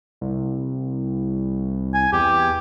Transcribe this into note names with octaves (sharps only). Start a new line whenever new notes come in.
C2
G#5
E2 G4